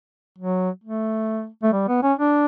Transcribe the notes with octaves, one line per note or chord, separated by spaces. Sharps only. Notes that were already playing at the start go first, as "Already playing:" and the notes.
F#3
A3
A3
G3
B3
C#4
D4